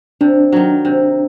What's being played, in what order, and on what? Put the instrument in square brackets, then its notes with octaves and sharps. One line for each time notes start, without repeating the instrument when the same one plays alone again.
[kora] C3 [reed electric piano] D4
[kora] D#3 F#3
C3